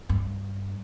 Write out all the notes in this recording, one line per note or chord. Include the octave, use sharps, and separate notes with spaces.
G2